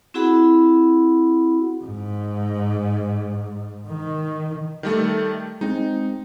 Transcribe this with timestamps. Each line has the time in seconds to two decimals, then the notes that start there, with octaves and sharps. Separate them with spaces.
0.14 C4 E4 F#4 G#4 F#5 B5
1.84 G#2
3.88 D#3
4.83 D#3 G3 A3
5.61 G#3 C4 D#4